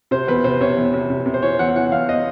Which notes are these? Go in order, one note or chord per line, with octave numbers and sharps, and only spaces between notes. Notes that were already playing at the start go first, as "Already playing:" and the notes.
C3 C5
E2 B4
C3 C5
C3 C#5
E2
C3
C3
C3
C5
E3 C#5
E2 F#5
E3 F#5
E2 F5
D#5